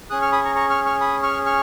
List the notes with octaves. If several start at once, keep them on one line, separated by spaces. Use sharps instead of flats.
C#4 G#4 D#6 F#6
C#6 F6
B5 D#6
A#5 C#6
A#5 C#6
C#6 F6
C#6 F6
B5 D#6
C#6 F6
C#6 F6